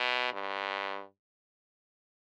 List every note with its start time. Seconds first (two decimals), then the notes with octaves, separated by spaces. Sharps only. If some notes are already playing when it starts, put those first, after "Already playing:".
Already playing: B2
0.33 G2